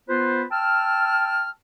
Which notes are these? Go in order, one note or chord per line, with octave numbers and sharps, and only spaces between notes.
B3 F4 B4 C5
G5 A5 E6 F6